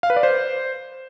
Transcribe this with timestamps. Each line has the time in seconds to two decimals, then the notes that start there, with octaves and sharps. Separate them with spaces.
0.03 F5
0.10 B4
0.17 D5
0.23 C5